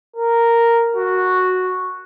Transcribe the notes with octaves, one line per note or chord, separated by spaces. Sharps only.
A#4
F#4